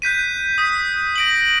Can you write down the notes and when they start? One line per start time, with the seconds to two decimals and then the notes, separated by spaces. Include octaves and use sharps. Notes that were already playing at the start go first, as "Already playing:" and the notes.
0.02 F#6 G6 B6 D#7
0.58 D#6 B6
1.16 A#6 D7 F#7